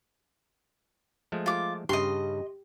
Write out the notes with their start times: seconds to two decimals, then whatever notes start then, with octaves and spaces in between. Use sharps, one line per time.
1.32 F3 G#3 A3
1.46 F4 D6
1.89 G2 C#3 G4 D#5 C6